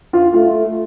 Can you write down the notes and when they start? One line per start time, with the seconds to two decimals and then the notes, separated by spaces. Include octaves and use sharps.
0.13 F4
0.34 A3 F4